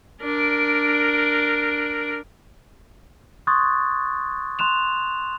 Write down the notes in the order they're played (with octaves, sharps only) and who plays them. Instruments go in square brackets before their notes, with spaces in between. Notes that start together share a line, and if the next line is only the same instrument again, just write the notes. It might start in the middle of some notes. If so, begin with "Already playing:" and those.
[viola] D4 A#4
[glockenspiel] C6 C#6 D#6 F#6 G#6 A6
C6 F#6 E7 F7